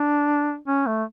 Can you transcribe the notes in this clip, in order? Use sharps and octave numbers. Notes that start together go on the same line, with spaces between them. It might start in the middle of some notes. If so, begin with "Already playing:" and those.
Already playing: D4
C#4
A3